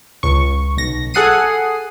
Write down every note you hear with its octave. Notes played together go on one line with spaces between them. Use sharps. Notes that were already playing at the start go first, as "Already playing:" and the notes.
C#2 C#6
B1 A#6
G#4 A4 F#5 D#6 C7 D#7